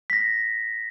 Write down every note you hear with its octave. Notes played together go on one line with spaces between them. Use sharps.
A#6 B6